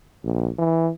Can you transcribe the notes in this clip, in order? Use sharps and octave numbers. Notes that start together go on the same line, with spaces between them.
A#1
E3